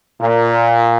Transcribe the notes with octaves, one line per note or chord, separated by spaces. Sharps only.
A#2